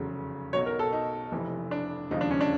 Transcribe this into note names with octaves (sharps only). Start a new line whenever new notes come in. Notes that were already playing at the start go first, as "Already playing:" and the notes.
Already playing: F1 E2 C#3 F#3
B1 B2 F#3 C#5
A#4
A4
D#4
F1 F2 C3 E3
D4
E1 D#2 C#3 F3 D#4
D4
C#4
D4